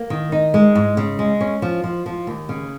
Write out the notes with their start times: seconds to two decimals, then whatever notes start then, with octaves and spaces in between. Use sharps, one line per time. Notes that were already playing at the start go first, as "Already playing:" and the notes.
Already playing: A#3
0.10 D#3
0.32 D#4
0.54 G#3
0.75 G#2
0.97 C#3
1.19 G#3
1.41 C#4
1.62 F3
1.84 F3
2.06 F3
2.27 D#2
2.49 C#3